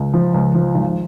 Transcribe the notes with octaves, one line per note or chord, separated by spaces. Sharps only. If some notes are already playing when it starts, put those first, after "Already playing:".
Already playing: C#2
F3
C#2
F3
G#1